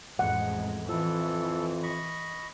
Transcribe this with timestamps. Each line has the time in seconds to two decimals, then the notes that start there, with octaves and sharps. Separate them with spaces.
0.19 A1 F2 G#3 F#5
0.89 F2 E3 A4
1.83 D#5 B5 C#6